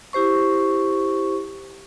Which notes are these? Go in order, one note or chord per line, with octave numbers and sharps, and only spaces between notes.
E4 G4 C5 C#6